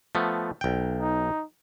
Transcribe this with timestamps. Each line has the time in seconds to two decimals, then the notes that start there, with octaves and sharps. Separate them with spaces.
0.15 F3 A3 B3
0.61 B1 G5
1.00 D#4